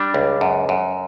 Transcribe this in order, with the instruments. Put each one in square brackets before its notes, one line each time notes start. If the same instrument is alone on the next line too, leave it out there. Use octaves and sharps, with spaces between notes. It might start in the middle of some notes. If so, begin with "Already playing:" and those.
Already playing: [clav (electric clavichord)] G3 D4
C#2
F#2
F#2